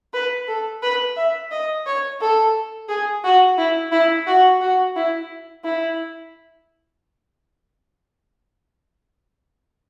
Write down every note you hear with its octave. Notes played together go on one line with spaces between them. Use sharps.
B4
A4
B4
E5
D#5
C#5
A4
G#4
F#4
E4
E4
F#4
F#4
E4
E4